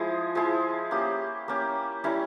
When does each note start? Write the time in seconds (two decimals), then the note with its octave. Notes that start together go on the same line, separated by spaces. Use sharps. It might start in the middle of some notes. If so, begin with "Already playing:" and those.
Already playing: F3 G#3 E4 G#4
0.35 F3 G#3 E4 G#4
0.91 A#3 C#4 G4
1.48 A#3 C#4 G4
2.04 G3 C#4 E4 A#4